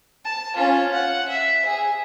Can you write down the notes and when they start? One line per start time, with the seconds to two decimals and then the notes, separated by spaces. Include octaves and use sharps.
0.25 A5
0.55 C#4 F4
0.93 F#5
1.28 E5
1.66 G#4